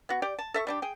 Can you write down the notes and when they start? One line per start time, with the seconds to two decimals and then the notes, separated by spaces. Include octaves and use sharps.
0.09 B3 F#4
0.22 G4 D5 G5
0.39 A5
0.54 A4 E5 C#6
0.67 G3 D4 G4
0.82 G#4 G5